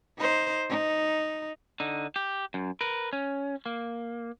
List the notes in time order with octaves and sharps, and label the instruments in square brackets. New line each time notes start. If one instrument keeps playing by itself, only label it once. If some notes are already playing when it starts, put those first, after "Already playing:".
[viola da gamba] D#4 C5
D#4
[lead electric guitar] D3 D#4
G4
F#2
A#4 B4
C#4
A#3